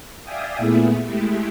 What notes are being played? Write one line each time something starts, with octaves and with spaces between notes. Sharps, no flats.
D5 E5 F5 G5 G#5 D#6
A#2 A3 B3 E4 G#4
G#3 A3 E4 G4